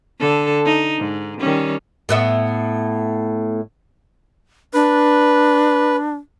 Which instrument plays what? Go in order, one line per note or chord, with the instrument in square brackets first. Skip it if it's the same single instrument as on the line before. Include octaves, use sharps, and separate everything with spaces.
[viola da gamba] D3 A4
D#4
G#2
D#3 G3 C#4
[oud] A2 B3 E5
[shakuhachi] D4 [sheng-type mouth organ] B4